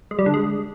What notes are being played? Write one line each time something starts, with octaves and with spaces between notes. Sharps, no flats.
G#3
G3
D3
G#3